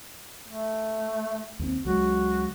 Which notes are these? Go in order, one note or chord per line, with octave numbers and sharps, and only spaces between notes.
A3
D#2 G3 C4
C#2 F#3 G#3 F#4